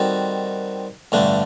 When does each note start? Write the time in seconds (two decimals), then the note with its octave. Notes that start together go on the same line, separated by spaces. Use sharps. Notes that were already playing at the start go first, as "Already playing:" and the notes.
Already playing: D#3 G3 C4 F#4 A4
1.12 A1 G2 D3 A3 D4